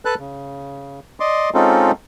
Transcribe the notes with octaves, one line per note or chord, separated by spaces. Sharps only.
A4 B4 A5 F#6
C#3
D5 D#5 C6 D6
G#3 C4 C#4 D#4 F4 A4